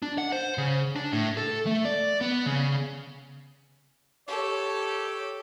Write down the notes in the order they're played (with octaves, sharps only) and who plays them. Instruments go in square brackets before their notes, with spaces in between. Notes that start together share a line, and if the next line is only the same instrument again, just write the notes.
[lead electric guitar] D4
F#5
C5
C#3
D4
A2
A4
A3
D5
B3
C#3
[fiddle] G4 A4 [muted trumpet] C#5